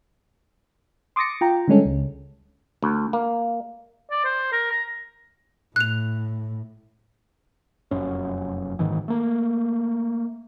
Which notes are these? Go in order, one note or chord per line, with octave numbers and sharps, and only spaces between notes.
C6 D6 D#6 A6 A#6 C#7
F4 G5 A#5
D3 G3 G#3 C#4 A4
C#2
D2
A#3
D5
C5
A#4
A#5
A2 F#6 F7
F1 F#2 C#4
F#1 G#2 D#3 E3
A3 A#3